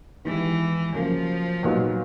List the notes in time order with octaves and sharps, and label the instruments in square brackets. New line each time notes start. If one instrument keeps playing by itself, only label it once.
[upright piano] D#3 G#3 B3 E4 G4 [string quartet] E3
[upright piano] C#3 F#3 A#3 [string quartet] F3
[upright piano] A#2 F#3 B3 D#4 F#4